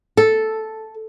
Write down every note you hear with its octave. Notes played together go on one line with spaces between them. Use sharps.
A4